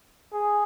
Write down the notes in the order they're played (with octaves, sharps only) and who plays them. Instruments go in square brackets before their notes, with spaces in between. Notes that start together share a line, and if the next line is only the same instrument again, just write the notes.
[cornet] G#4